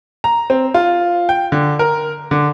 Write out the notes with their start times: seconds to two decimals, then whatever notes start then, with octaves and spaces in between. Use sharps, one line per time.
0.24 A#5
0.50 C4
0.74 F4
1.29 G5
1.52 D3
1.79 A#4
2.31 D3